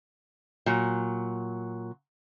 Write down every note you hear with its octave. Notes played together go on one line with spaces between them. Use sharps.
A#2 F#3